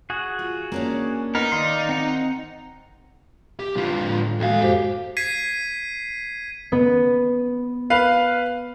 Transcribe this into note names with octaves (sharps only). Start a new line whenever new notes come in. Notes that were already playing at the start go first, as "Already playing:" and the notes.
F#4 G#4
F4
A#3 C#4 D4
B3 D#4 A#4
D#3 D5 F5 C6
C4 F#5 A#5
G4
D3 F4
A2
D#2 G#3 F#4 A4 F5
F#2 G4 C5
G#6 B6 C7 D#7
B3
B4 F5